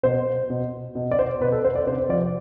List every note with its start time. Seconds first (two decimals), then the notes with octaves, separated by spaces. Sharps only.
0.03 B2 C5
0.50 B2
0.95 B2
1.11 D5
1.19 C5
1.41 B2 B4
1.52 A4
1.65 C5
1.76 D5
1.87 C3 C5
2.09 F3 D5